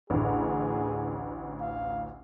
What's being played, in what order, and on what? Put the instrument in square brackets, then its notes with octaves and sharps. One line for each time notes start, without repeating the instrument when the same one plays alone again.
[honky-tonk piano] A1 D2 [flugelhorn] G#4
[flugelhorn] F5